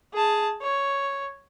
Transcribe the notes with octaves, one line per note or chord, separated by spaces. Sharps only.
G#4 A5
C#5